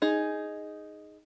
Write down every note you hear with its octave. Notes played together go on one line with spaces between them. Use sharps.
D#4 G#4